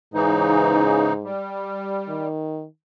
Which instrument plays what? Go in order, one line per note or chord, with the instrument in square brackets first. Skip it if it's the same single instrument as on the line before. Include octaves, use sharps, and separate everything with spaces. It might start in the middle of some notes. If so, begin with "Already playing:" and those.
[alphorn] G#2 [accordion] C#3 E3 D#4
[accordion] G3
[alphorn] D#3